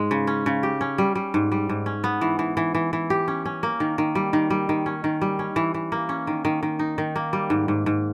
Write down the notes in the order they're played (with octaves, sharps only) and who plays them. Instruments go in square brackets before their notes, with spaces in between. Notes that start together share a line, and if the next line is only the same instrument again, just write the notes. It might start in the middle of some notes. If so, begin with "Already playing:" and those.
Already playing: [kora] G#2 G#3
C#3
C#4
C#3
G4
C#4
G3
G3
G#2
G3
G#2
C#4
B3
E3
E3
E3
E3
E3
G4
C#4
C#4
A#3
D#3
D#3
G3
D#3
G3
D#3
C#4
D#3
G3
C#4
E3
E3
A#3
C#4
D#3
D#3
D#3
D#4
D#3
A#3
G3
G#2
G#2
G#2